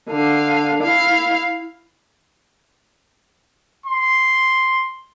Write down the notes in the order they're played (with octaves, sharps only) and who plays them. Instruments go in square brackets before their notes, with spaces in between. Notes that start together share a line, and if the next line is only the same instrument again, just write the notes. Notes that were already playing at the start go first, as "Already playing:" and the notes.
[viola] D3 F5
E4 F5
[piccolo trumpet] C6